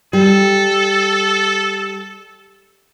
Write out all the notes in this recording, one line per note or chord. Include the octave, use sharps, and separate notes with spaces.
G3 A4